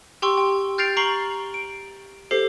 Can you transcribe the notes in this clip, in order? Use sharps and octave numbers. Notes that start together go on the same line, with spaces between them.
G4 G5 C6 C#6 E6
G5
F6 G6 A6 C7 D7 F7
A#5 C#6 C7 F#7 G7
D7
G4 A4 C5 C7